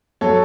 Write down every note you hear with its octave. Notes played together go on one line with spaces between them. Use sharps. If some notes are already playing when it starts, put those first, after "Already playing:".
F#3 A4 C#5